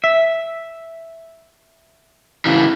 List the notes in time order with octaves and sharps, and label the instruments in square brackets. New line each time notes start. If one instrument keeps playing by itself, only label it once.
[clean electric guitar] E5
[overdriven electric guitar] C#3 E3